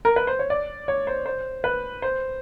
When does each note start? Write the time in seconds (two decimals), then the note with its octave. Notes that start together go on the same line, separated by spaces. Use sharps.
0.05 A#4
0.16 B4
0.27 C5
0.39 C#5
0.50 D5
0.88 C#5
1.07 C5
1.26 C5
1.64 B4
2.02 C5